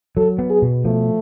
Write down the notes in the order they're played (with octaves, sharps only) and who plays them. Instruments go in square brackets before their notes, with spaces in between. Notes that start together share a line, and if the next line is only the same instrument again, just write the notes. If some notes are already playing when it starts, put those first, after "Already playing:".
[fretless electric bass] F#3 [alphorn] A4
[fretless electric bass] B3
[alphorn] G#4
[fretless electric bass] B2
[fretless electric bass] F3 [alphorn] A3